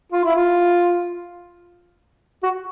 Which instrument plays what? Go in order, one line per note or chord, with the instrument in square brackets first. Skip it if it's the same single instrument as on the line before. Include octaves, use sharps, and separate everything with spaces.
[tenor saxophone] F4
E4
F4
F#4